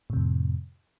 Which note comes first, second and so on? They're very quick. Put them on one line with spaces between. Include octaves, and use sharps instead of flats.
A2 C3 F2